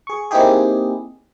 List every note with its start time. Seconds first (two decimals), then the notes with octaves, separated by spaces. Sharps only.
0.07 G#4 C#6
0.31 A#3 C4 D#4 E4 G4 G#4